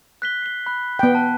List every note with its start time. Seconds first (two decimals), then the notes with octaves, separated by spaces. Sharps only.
0.22 F#6 B6 G7
0.42 C7 G7
0.66 B5 F#6
0.99 B3 G5
1.15 A5 F#6